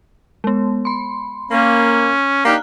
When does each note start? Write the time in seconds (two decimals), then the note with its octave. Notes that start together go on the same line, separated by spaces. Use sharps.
0.44 G#3 B3
0.85 B5 C6
1.51 A#3 C#4
2.45 A#3 D4 D#4 G4 A#5 F6 F#6